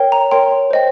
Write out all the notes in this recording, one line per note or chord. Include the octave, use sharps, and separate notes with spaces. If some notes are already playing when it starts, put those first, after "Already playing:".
Already playing: A#4 C#5 G5
A#5
A#4 C#5 G5 C6
C5 D#5 G5